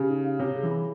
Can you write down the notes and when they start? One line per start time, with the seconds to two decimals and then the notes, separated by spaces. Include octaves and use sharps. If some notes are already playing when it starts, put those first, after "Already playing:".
Already playing: C#3 G4 C#5
0.09 D#4
0.24 F5
0.39 C3 C#5
0.55 G#4
0.63 E3
0.71 B5